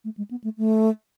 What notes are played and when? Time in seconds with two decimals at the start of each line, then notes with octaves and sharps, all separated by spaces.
0.04 A3
0.17 G#3
0.31 B3
0.44 A3
0.58 A3